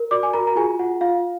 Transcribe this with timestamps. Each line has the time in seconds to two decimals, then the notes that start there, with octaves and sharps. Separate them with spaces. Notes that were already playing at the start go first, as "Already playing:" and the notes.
Already playing: A#4
0.11 F#4 D5 D6
0.23 G#5
0.33 F#4 A#4 A#5
0.47 A#5
0.56 F4 G#4 G#5
0.79 F4 F#5
1.01 F4 F5